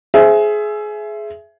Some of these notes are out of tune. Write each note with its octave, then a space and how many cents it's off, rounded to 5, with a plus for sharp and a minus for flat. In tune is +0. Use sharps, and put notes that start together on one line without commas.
G#4 +20 C5 +0 E5 +15